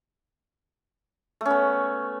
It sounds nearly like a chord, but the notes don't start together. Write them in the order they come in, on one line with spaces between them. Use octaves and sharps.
A3 C#4 B3